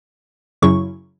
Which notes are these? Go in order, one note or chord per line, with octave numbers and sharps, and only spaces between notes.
F#2 C#3 F#3 C#4 E4 C#6